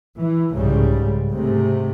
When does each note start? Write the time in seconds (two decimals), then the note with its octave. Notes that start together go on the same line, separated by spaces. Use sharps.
0.21 E3
0.53 C2 G#2 C#3 G3
1.32 G#2 C3 A3